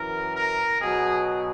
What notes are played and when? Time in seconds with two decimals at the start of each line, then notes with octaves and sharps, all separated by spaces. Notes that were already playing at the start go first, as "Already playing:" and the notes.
Already playing: F#2 E3 A#4
0.36 A#4
0.82 B2 F#3 G#4